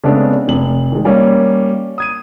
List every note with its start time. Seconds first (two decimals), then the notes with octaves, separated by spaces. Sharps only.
0.04 C#3 G#3 A3 B3 C4 D4
0.48 F1 F#7
0.92 D#3 G#3
1.05 G3 A#3 C#4
1.98 D#6 G#6 D#7